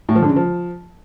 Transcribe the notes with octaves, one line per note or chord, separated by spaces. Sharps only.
A2
F3
D3
C#3
F3